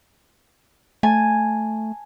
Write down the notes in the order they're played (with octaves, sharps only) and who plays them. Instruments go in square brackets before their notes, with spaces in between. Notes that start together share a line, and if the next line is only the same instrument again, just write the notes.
[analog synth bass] A3 [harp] G#5 A5